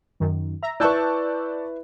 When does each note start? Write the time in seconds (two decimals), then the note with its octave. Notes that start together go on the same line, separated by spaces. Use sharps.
0.20 F#2 D#3
0.62 E5 A#5
0.80 E4 B4 D5 A5 C#6 E6 F#6 G6